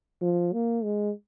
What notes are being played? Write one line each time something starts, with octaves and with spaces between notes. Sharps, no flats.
F3
A#3
G#3